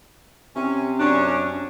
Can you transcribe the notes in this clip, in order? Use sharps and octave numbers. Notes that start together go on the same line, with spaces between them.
C3 C#4
F#2 C#4 D4